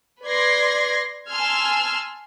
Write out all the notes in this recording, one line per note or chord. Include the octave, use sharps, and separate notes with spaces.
B4 D5 C6 G#6 A#6
G#5 A5 C6 E6 F6 G#6